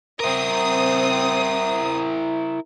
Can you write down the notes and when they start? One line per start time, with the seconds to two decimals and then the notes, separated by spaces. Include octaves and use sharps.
0.20 C4 E4 A#4 D#6